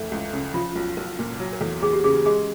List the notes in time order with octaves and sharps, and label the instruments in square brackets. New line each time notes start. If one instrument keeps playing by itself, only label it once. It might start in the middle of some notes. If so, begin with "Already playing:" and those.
Already playing: [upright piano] F#1 F2 E3 A3
C#2
C#3
[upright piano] F3 [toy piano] F4
[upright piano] B1
[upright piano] B1 [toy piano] A#4
[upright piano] A#2
F#3
[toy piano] A#4
[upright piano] E2 [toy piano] A4
[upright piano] E2 [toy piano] G#4
[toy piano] G4
[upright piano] C#3 [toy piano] G#4
[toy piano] G4
[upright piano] G#3 [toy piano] G#4